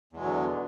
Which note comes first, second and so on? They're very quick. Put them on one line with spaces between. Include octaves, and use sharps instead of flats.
E2 G#3 B2 F#3 D3